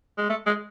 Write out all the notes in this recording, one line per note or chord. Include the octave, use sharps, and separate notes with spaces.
G#3
A3
G#3